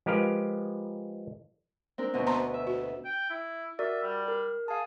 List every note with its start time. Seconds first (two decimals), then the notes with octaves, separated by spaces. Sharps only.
0.06 F3 G#3 G4 A#4 B4 F5
1.98 C4 D4 A#4
2.14 D2 B2 C4
2.27 B3 A5 A#5 C6
2.54 E5
2.67 F#4
3.05 G5
3.30 E4
3.79 F#4 A#4 D5 E5
4.03 G3
4.28 A#4
4.68 G#4 F5 A5